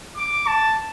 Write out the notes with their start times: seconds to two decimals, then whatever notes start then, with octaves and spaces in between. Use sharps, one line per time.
0.17 D6
0.47 A5